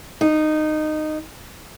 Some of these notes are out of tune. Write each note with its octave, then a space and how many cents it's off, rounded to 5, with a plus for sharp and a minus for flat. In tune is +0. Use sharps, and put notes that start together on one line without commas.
D#4 -15